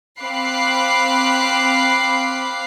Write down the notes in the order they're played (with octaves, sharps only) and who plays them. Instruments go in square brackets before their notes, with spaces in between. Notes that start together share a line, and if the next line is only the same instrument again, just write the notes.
[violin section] C4 F5 B5 D6 F#6 C7